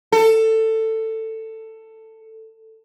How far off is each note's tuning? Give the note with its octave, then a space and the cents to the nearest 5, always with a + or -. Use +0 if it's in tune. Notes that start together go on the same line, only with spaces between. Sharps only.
A4 +15